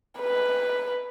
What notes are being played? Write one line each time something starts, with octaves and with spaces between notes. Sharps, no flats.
B4